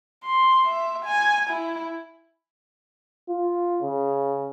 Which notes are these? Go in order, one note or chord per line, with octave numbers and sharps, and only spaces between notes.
C6
E5
G#5
E4
F4
C#3